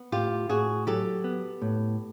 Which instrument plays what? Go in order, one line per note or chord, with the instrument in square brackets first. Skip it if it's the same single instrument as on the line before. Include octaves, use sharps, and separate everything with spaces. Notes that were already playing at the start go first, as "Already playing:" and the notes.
Already playing: [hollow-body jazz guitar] B3
[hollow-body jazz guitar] A2 [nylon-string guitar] F4 G4
[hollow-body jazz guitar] A2 [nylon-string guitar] F#4 G#4
[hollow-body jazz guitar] F#3 [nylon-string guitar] G4 A4
[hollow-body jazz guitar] B3
A2